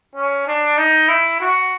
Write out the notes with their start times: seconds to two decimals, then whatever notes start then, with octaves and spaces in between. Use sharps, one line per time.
0.15 C#4
0.47 D4
0.78 D#4
1.08 E4
1.41 F#4